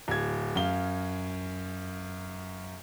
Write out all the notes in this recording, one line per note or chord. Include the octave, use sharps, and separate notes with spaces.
D1 G#6
F#2 F5 G7